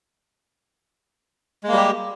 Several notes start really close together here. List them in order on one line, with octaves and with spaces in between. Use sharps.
G#3 A#3 G3 G4